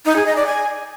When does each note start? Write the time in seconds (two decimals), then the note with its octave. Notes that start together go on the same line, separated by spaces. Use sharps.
0.06 D#4
0.16 G#4
0.26 D#5
0.36 D5
0.46 G#5